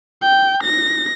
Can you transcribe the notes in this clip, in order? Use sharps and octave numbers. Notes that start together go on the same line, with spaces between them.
G5
A#6